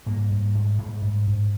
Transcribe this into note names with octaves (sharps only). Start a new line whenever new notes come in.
G#2 G3 A#3
G#2
G#2
G#2
G#2
G#2